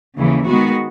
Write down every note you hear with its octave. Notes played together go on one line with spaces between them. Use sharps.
D#2 C#3 E3
D#3 G#3 B3 F#4